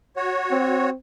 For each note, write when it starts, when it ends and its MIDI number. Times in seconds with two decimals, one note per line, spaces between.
0.16 0.90 66
0.16 0.90 73
0.51 0.94 60